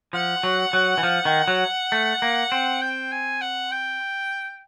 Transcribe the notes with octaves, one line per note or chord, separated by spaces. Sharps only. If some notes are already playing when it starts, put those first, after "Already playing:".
F3 F#5
F#3
F#3
E3
F3
D#3
F#3
A3
A#3
C4
G5
G#5
F#5
G5